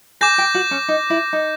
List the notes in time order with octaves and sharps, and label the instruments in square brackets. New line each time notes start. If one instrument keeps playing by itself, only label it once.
[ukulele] G#4 [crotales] D6 G6 A#6
[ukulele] G4
F#4
C#4
D#4
E4
D#4